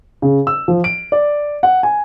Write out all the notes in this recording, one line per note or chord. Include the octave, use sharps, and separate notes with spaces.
C#3
E6
F3
D7
D5
F#5
G#5